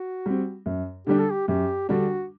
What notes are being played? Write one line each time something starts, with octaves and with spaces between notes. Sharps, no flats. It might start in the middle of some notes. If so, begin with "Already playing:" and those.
Already playing: F#4
G3 C4
F#2
D3 G3 D4 G4
A4
G4
F#2 G4
D3 G3 D4 F#4